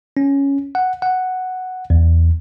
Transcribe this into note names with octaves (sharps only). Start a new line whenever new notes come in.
C#4
F#5
F#5
E2